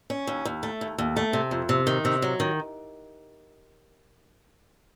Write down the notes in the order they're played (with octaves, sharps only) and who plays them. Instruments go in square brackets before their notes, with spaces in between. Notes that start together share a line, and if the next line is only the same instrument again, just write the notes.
[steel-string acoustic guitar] C#4
D#2
D#2
A3
D#2
D#2
A3
C3
F2
C3
D#3
C3
F#3
D#3